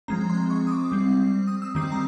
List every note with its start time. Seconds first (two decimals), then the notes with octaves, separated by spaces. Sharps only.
0.08 F3 G#3 C4 A#5
0.30 C6
0.50 C#6
0.67 D#6
0.71 D6
0.92 G3 C4
1.48 D#6
1.62 E6
1.75 D#3 G3 C4 D#6
1.92 A#5